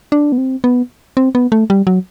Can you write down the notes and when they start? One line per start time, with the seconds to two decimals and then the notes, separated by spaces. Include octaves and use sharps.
0.12 D4
0.32 B3
0.38 C4
0.64 B3
1.17 C4
1.35 B3
1.52 A3
1.70 G3
1.87 F#3